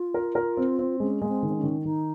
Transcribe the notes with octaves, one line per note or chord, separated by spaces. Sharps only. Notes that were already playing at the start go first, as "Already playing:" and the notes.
Already playing: F4
A#4
A#4
C4
C4
G#3 C#4
G#3 A#3
C4
D#3
C4
C#4
D#3
C#4
D#3 D#4